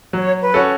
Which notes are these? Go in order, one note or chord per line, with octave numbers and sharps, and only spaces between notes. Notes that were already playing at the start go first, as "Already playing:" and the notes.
F#3 C#5
B4
C#4 F#4 A4